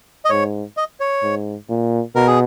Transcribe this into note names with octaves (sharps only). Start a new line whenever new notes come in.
D#5
G#2 C#5
D#5
C#5
G#2
A#2
B2 A#4
G#4